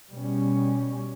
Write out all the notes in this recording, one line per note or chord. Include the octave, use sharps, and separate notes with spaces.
B2 G3 C#4